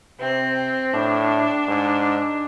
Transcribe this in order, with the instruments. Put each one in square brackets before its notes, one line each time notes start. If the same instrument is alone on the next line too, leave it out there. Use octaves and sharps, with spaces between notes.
[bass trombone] C3 [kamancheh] C4
[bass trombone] A2 [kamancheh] D4
[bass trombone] G#2